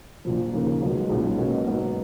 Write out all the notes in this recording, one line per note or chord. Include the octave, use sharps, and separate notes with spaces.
A#1 A#2 F3
D#2 C#3 F3 A#3
B1 B2 G#3
B1 A#2 G#3 C#4
B2 A#3 C#4
G#2 F#3 B3